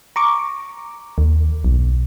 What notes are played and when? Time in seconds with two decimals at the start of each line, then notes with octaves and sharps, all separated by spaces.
0.16 A#5 C#6 D6
1.18 D#2
1.65 B1